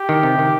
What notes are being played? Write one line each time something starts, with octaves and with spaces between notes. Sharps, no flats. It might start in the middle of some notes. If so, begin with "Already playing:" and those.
Already playing: G4
D#3
C3
D#3